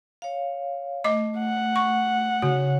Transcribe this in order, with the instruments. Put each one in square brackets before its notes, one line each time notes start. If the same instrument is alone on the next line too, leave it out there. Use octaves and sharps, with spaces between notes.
[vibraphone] C#5 F5
[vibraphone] A3 [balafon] D#5 D6
[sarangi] F#5
[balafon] C#6
[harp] C#3 [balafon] F#4